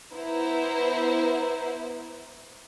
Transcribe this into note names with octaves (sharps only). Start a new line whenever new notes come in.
B3 E4 C5 A#5